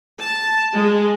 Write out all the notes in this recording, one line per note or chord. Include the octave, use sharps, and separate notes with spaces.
A5
G#3